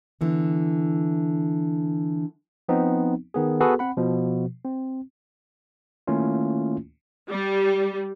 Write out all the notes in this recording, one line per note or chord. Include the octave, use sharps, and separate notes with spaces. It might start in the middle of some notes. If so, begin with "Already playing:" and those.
D3 E3 B3
F3 B3 C4 D#4
D#3 B3 G#4
B3 F#4 G#4 A4 B4
C4 F#5 B5
B2 F3
C4
D#3 A3 A#3 C#4 E4 F4
G3